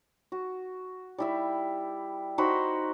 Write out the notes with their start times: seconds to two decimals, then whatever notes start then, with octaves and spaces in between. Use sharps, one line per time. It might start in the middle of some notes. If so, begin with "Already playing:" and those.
0.32 F#4
1.18 G3 E4 E5
2.38 D#4 F#4 C5 B5